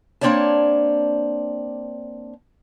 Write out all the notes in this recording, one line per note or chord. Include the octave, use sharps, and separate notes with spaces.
A#3 C4 D4 C#5 D5 A5